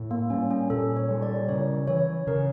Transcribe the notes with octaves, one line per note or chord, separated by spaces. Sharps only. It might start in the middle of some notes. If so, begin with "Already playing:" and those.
Already playing: A2
A#3
G3 C#4
C#4
A#2 A4
C#5
G3
D5
C#3 C#5
E3 C#5
C#3 A#4